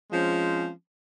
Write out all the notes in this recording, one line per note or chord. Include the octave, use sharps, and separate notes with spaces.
F3 G#3 C4 C#4